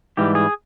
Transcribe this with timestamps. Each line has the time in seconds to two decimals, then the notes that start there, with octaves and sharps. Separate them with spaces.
0.17 G#2 E3 G3 G4
0.35 G#4